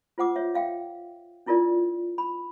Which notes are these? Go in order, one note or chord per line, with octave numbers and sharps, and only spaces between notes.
F4 C5 F#5 D6 E6
C#5 E5
E5 F5 G5
D4 E4 F4 A#4 D5
B5